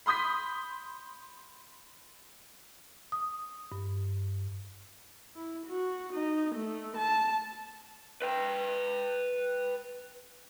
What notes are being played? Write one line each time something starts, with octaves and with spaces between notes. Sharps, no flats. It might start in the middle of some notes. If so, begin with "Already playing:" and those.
B5 C6 D#6 G6 B6
D#6
G2
E4
F#4
D#4
A3
A5
B4 G5